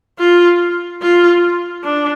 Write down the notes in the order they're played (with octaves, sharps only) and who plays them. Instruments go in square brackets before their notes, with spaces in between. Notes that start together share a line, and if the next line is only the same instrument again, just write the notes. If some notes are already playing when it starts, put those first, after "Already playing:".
[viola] F4
F4
D4